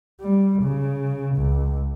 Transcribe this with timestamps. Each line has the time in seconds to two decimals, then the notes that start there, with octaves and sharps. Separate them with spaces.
0.21 G3
0.62 C#3
1.37 C#2